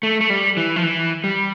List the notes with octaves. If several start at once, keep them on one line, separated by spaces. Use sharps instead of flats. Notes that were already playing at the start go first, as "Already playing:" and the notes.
A3
A3
G3
E3
F3
E3
G3